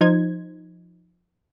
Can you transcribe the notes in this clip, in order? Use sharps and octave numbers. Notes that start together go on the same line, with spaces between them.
F3 D#4 C5 G#6